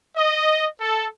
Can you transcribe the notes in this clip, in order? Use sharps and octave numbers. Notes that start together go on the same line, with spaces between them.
D#5
A4